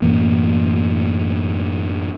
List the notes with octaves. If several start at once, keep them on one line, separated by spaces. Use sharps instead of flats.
F#2 A2 E3 A#3